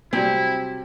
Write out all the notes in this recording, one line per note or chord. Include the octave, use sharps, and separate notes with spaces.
C3 F#3 G3 C4 E4